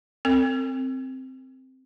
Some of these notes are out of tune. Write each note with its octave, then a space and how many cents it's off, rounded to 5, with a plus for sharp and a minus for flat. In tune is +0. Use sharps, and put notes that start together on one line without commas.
C4 +0 A#4 -45